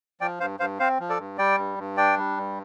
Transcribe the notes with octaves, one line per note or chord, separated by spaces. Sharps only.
F3 D5 G5
G2 C5 F5
G2 C5 F5
C4 C5 F5
F3
A4 D5
G2
G3 D5 G5
G2
G2
D4 D5 G5
G3
G2